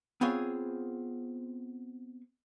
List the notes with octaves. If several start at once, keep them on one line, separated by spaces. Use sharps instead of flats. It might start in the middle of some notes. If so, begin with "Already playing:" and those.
B3 C4 F4 G#4 C#5